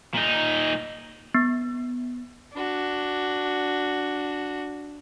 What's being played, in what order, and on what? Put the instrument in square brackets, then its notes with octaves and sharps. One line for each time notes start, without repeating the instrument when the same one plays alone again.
[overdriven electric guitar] A#2 D#4
[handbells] B3
[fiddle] D4 F#4